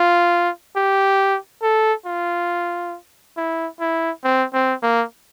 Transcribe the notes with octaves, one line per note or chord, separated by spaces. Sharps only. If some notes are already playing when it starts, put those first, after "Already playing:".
Already playing: F4
G4
A4
F4
E4
E4
C4
C4
A#3